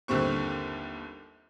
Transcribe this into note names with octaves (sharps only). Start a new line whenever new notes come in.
G1 D#2 D3 G3 C4 C#6